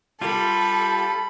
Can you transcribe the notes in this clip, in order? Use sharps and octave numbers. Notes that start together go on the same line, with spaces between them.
G3 F4 G4 A4 B5